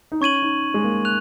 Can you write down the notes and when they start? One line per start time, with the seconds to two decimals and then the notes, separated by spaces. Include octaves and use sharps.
0.12 D#4
0.21 C#4 C#6 G#6 D#7 F#7
0.43 D#4
0.74 G#3
0.84 A#3
1.05 F#6 F7